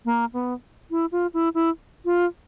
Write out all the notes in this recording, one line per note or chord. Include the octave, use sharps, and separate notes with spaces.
A#3
B3
E4
F4
E4
E4
F4